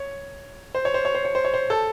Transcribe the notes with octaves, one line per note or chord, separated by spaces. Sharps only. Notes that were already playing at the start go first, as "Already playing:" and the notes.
Already playing: C#5
C5
C#5
C5
C#5
C5
C#5
C5
C#5
C5
A4